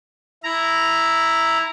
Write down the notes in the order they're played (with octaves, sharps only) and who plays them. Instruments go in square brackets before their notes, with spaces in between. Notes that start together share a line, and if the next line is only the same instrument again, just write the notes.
[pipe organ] E4 A#5